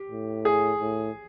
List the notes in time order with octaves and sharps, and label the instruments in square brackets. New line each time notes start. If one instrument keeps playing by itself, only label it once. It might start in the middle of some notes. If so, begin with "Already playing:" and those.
Already playing: [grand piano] G4
[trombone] A2
[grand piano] G#4
[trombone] A2